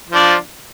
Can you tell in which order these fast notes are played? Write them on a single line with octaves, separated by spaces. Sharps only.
F3 D4 F4